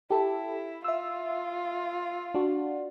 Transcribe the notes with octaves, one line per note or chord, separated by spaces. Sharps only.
E4 G4 A4
F4 E5 E6
D4 F#4